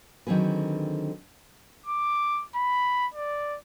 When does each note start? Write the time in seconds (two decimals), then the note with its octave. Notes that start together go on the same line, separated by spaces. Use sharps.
0.27 D3 D#3 F#3 C4 G#4 B4
1.86 D6
2.56 B5
3.14 D5